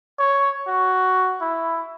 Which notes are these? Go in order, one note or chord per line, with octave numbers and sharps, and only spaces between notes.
C#5
F#4
E4